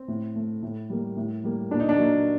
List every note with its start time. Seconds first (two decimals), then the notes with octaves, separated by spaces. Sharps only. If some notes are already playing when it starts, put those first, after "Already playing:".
Already playing: C4
0.08 A2
0.36 A3
0.63 A2
0.90 G3 A#3
1.17 A2
1.44 G3 A#3
1.71 A#2 D4
1.80 D#4
1.89 D4
1.97 F#3 A#3